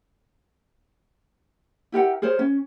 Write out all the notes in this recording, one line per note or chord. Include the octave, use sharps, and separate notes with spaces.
E4 G4 A#4 F#5
G#4 A#4 C5 C#5
C#4